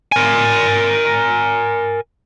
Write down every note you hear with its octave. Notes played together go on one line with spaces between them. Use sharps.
A#4 G#5